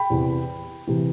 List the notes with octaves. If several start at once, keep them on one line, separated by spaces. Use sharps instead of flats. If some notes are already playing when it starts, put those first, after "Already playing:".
Already playing: G5 B5
E2 C3 E3
C3 E3